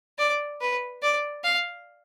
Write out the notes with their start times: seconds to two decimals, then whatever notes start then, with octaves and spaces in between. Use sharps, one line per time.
0.18 D5
0.61 B4
1.02 D5
1.44 F5